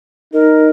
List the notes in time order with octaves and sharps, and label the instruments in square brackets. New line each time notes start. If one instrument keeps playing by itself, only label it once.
[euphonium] D#4 [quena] A#4